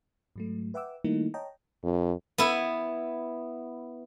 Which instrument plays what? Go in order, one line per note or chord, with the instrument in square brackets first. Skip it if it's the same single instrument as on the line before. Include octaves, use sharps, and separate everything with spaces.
[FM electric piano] G#2 F#3 A3
B4 E5 F#5 G5 D6 E6
D#3 G3 A3 A#3 D#4 E4
C#5 D#5 G5 A5 A#5
[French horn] F2
[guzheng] B3 E4